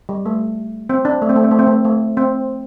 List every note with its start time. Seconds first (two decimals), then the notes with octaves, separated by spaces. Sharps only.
0.09 G3
0.26 A3
0.89 C4
1.05 D4
1.22 A3
1.29 C4
1.36 A3
1.44 C4
1.51 A3
1.59 C4
1.67 A3
1.85 A3
2.17 C4